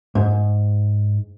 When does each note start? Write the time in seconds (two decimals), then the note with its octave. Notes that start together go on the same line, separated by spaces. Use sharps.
0.15 G#2